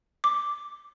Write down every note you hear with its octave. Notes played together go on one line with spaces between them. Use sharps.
D6